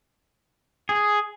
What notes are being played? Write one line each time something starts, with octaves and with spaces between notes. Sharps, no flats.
G#4